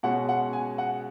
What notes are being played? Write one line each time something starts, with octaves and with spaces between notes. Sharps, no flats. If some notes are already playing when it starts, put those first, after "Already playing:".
B2 G#3 C#4 F#5
F#5
G#5
F#5